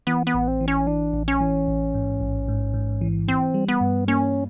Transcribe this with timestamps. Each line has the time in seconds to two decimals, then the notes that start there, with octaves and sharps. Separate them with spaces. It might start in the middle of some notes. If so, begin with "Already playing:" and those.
0.07 E3 B3
0.27 B3
0.34 A1
0.48 C4
0.61 E3
0.68 C#4
0.87 E3 D4
1.14 A1
1.28 C#4
1.40 E3
1.68 A1
1.94 G#2
2.21 A1
2.48 G#2
2.74 G#2
3.01 E3
3.28 E3 C4
3.54 G3
3.68 B3
3.81 G2
4.08 A#3 C#4